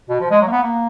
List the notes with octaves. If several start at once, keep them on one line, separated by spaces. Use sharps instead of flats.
B2
F3
G#3
F#3
A#3
B3
A#3